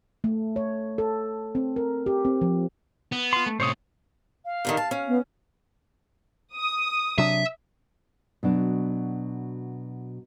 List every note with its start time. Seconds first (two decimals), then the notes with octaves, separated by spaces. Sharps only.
0.24 A3
0.56 C#5
0.98 A4
1.55 C4
1.76 A#4
2.06 G4
2.25 C4
2.41 F3
3.12 B3
3.33 F4 C6
3.46 A3
3.60 A2 C3 C5 C#5 D#6
4.45 F5
4.65 G2 D3 D#3
4.77 A5
4.91 C#4
5.08 B3
6.55 D#6
7.18 C3 F#3 D4 E5
8.43 B2 F#3 D4